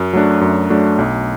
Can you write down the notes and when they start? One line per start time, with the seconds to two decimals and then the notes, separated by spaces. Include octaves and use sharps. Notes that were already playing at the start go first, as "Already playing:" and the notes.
Already playing: F#2
0.13 F#3 A3 D4
0.41 F#2
0.70 F#3 A3 D4
0.98 B1